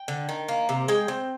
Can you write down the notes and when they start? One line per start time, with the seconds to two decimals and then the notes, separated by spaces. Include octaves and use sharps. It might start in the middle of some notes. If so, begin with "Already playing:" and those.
Already playing: G5
0.08 D3
0.29 D#3
0.48 A#3
0.69 C3
0.88 G#3 G5
1.08 C4